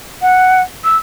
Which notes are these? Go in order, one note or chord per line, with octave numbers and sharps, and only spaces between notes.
F#5
E6